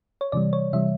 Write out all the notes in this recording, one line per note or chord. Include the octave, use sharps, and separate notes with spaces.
C#5
C3 E3 G3 D5
C#5
C3 E3 G3 E5